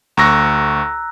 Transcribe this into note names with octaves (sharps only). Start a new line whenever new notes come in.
D2 A#5 C#6 E6 F#6 A#6